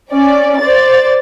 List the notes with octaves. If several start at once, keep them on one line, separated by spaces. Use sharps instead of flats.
C#4 D5
C5 D5 A6